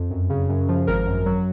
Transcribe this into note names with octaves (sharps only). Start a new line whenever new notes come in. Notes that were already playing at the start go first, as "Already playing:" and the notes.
Already playing: F2
F#2
C#3
F#2
F3
G#1 A#4
F#2
F#3